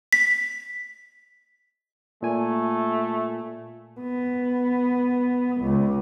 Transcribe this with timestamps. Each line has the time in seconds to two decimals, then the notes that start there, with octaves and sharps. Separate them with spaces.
0.13 B6
2.22 A#2 A3 G#5
4.01 B3
5.62 C#2